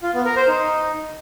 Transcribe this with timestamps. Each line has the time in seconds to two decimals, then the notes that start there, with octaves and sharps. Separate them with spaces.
0.03 F4
0.14 B3
0.25 A#4
0.36 C5
0.48 D#4